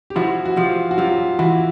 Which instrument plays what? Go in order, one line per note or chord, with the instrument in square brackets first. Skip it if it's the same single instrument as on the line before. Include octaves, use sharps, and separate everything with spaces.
[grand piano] G4
[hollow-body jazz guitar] F3 [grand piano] E4 F#4
[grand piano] F#4
[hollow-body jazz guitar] F3 [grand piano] F4 G4
[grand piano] F#4
[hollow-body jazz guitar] F#2 [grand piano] F4 G4
[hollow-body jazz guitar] E3 [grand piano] E4 F#4